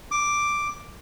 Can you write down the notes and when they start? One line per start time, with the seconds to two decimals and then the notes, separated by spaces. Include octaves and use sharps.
0.11 D6